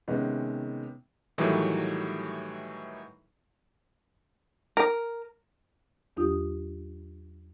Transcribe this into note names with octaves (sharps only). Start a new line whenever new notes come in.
C3 D#3 G#3 B3 C#4
A2 D#3 E3 F#3 G3 A3
A#4
E2 F#3 D4 F4 G4 D#6